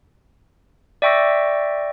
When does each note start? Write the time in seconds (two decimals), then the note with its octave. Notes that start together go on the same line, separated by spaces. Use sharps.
1.02 D5 E5 G5 C#6 E6 A#6